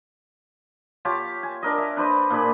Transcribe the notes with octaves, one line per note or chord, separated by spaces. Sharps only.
F4 G4 C#5 A5
G#5
D4 A#4 D#5
E5
D4 B4 C5 D#5
A#2 D4 G#4 B5